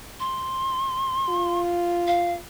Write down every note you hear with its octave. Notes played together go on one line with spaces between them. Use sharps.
C6
F4
F5